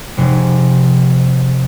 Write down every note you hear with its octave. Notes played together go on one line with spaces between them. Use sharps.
F1 C3 G#3